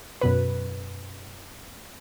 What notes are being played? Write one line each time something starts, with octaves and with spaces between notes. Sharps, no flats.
F#2 B2 B4